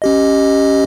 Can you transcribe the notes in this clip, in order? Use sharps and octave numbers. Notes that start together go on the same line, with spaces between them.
C#4 G4 D#5